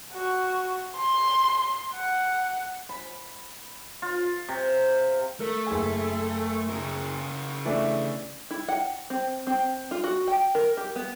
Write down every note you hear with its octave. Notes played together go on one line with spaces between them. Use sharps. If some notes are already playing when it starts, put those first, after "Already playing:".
F#4
C6
F#5
B5
F4
C3
A3 A#4
F#1 G#4
C#3 A#4
E3 A3 D4
E4
F#5
C4
C4
F4
F#4
G5
A#4
G4
B3